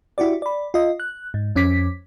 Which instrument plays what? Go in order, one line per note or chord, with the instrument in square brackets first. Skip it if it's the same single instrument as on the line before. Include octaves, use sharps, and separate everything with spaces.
[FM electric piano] E4 F#4 G4 D5
D5 B5
F4 D#5
F#6
G#2
F2 C#4 D6 B6